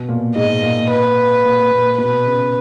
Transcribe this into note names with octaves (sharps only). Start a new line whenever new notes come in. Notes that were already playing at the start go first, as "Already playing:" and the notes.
Already playing: B2
A#2
G#2 D#5
A#2
B4
A#2
A#2
B2 B4
C#3